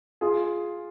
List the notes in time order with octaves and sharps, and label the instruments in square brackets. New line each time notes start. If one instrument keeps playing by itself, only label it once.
[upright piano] F4 G#4